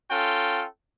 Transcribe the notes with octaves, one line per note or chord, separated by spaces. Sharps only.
C#4 F4 A4 G5